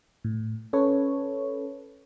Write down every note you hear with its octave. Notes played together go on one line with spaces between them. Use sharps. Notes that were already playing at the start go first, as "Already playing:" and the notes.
A2
C#4 A4 B4 C#5